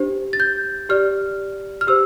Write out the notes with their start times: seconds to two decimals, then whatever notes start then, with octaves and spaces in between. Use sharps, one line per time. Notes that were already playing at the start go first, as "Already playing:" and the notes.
Already playing: D4 G4 C5
0.33 A6
0.40 G6
0.89 G4 D5 F6
1.81 F6
1.87 G4 C5 E6